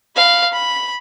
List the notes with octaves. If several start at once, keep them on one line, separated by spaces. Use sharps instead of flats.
F5 B5
B5